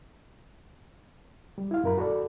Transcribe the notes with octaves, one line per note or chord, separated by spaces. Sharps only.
G3
E4 F5
F#2 A#4 B5
F#4 A4 D5